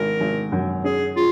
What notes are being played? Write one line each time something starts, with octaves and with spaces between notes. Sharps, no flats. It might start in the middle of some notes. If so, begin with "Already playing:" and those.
Already playing: G#1 A#4
G#1
F#2
C#4 G#4
F4 G#4